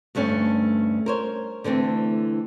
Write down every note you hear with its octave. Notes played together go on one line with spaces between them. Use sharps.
D2 G2 A3 C#4
A#4 C5 C#5
D3 E3 A3 C4